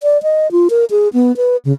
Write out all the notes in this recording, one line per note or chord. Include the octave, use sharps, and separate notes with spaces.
D5
D#5
F4
A#4
G#4
B3
B4
C#3